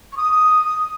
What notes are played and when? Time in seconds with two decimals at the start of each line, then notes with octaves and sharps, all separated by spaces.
0.12 C#6
0.17 D#6